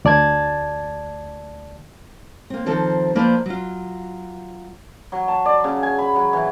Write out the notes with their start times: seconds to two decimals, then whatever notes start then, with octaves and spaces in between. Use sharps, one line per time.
0.05 D2 D5 A5 G#6
2.50 A#3 C4
2.66 D#3 F3 C4 F4 A4 C5
3.15 F3 A#3 D4 B4 C5 D5
3.46 F#3 F4
5.12 F#3
5.28 A5
5.45 D5
5.64 C#3
5.83 G#5
5.99 B5
6.16 F#3
6.33 E3